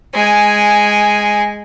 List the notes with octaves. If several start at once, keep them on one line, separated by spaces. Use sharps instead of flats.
G#3 G#5